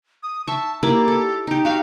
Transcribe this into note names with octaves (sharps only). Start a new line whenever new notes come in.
D#6
E5 A5 C#6
A#3 E4 G4 D5
A4
D#4 G4
F#4 G4 F5